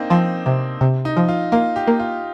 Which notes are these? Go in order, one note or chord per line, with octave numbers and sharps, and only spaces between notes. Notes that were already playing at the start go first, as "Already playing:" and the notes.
Already playing: A#3 C4 D4 D#4
F3 C4
C3
C3
D#4
F3
F4
A#3 F4
G4
A#3
F4